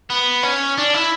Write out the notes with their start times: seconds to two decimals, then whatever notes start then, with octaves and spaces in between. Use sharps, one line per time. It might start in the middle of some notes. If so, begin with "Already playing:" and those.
0.10 B3
0.43 C#4
0.78 D4
0.94 E4